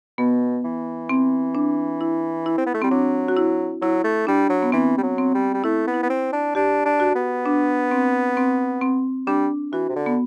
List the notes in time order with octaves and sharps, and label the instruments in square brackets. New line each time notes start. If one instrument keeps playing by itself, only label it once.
[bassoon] B2 [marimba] B3
[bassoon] E3
[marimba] C4
D4
E4
E4
[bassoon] C4
B3
A3
[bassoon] G3 [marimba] C4
[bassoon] F#3 [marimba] D4
[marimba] F#4
E4
[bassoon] F#3 [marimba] E4
[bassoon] A3
[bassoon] G3 [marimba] D4
[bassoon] F#3
[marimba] B3
[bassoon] E3 [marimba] C4
[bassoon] G3
F#3
[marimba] C4
[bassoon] G3
G3
[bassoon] A3 [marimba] E4
[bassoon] B3
[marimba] E4
[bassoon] B3
C4
D4
[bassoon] D4 [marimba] G4
[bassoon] D4
[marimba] F#4
[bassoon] B3
[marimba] D4
C4
C4
C4
[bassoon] G3 [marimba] D4
[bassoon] E3 [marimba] F#4
[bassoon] C3
D3
[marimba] B3